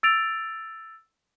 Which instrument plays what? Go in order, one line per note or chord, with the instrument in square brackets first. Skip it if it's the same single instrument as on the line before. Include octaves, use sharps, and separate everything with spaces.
[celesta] E6 A6 D7 F7